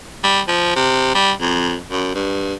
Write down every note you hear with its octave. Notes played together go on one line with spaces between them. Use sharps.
G3
F3
C3
G3
F2
F#2
G2